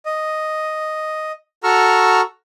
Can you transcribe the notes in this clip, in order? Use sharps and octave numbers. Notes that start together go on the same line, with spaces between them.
D#5
F#4 A4 A#5 C#6 E6 F6